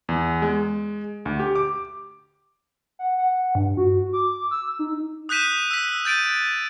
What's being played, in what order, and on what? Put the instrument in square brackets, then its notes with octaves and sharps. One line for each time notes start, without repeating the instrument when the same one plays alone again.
[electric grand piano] E2
G#3
D2
G4
D6
[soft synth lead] F#5
F#5
G2
F#4
D6
E6
D#4
[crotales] D#6 F#6 G6 B6 D#7 E7
E6 B6
G6 A6 D7 D#7